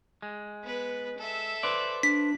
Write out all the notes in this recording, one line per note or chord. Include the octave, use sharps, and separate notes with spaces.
G#3
B3 B4
A4 E5
B4 C5 D5
D4 B6